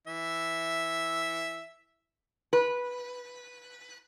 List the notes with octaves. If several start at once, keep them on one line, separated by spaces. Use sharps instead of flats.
E3 E5
B4